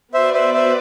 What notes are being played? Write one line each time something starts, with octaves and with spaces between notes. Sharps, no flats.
B3 F#4 B4 C5 D5 E5
C5 E5
C5 E5